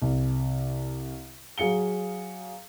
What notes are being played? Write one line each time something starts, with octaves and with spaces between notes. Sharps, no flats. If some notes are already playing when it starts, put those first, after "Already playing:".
C2
F#3 G#4 F5 C#7 G7